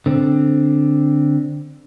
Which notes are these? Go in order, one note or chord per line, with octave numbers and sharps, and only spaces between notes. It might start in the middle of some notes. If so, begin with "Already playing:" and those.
D3 C4